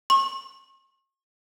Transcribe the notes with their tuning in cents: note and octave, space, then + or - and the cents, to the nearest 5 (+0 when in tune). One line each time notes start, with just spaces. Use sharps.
C#6 -45